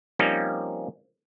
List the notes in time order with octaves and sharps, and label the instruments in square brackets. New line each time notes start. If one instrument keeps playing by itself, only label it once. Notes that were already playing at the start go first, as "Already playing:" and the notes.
[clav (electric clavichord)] F3 G3 A#3 C4 C#4 D#4